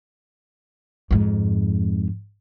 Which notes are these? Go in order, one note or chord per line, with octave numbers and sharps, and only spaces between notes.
F2 G#2